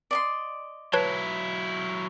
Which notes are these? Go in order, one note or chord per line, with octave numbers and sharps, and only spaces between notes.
D5 D#5 C6
F#3 E4 B4 C#5 A5